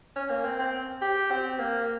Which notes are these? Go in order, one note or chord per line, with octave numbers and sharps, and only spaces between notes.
C#4
A#3
C4
C4
G4
C4
A#3